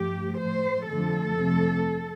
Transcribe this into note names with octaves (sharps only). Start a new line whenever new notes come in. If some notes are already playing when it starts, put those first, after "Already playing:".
Already playing: G2 F3 A3 G4
A2 F3 A3 C5
F2 D3 F3 A3 A4
F2 C3 A3